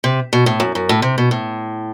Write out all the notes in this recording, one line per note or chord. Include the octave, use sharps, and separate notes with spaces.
C3
B2
A2
F#2
F#2
A2
C3
B2
A2